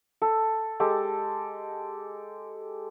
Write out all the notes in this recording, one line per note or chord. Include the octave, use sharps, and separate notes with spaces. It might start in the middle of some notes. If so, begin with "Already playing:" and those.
A4
G#3 G4 A4